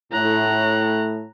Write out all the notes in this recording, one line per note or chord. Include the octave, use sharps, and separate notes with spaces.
A2 A#5 F#6